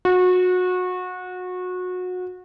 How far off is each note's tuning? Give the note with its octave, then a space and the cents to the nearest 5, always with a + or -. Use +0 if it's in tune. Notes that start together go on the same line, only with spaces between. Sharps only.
F#4 -25